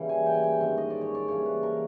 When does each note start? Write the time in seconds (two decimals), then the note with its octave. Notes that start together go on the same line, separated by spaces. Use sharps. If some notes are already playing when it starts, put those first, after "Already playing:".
Already playing: C#3 E3 G3 A#3
0.09 G#5
0.26 G5
0.35 G#5
0.44 G5
0.60 G2 D#3 G#3 C#4 E5
0.77 D#5
0.90 D5
1.01 C#5
1.15 D5
1.28 C#3 E3 G3 A#3 C#5
1.46 B4
1.63 A#4